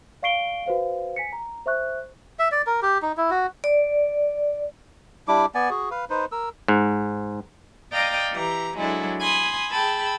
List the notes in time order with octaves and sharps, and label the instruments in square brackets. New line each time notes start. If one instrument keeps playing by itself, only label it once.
[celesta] D5 F5 C#6 C7 D7 G7
F#4 B4 C5 F5
G#5 B6 C#7
A#5
C5 E5 C#6 F#6
[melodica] E5
D5
A#4
G4
D#4
E4
F#4
[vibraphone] D5
[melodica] G3 D4 E4 D6
B3 D5 G#5
F#4 G#4
B4 F5
D#4 B4 C5
A#4 E6
[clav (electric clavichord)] G#2
[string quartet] D5 D#5 F5 G5 A#5 D#6
E3 G4 A#5
F#3 G#3 D4 E4 A4
G#5 B5 C6 D#6
G#4 G5 A5 B5 E6